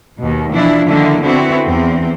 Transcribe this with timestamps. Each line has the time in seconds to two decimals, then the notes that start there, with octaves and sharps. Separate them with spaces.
0.19 D#2 B2
0.53 B2 E3 F3 D4 E4
0.89 D3 D#3 A#3 E4
1.23 D3 B3 C4 E4 F#4
1.66 E2 C4